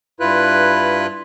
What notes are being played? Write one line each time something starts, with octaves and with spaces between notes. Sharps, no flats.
G2 E4 F4 B4 F#6